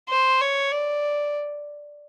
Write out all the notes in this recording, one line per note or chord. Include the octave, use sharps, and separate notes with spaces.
C5
C#5
D5